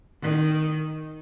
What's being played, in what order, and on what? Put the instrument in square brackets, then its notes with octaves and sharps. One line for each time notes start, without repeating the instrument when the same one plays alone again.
[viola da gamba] D#3